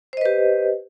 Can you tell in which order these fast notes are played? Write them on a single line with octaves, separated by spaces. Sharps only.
C5 D#5 B4 G4